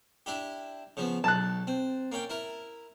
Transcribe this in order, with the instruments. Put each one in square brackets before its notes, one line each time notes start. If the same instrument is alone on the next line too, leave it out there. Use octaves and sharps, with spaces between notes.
[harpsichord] D4 E4 G4
C#3 F3 B3
[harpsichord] B1 [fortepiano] A5 F#6
[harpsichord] C4
A#3 C#4 G5
E4 A#4